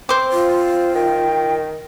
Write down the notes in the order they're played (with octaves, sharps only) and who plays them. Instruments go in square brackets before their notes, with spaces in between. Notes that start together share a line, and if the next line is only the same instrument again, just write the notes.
[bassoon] C4 [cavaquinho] C5 D6
[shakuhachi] F4
[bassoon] D#3 [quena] G5